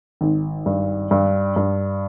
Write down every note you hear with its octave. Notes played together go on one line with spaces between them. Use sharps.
G#1
G2
G2
G2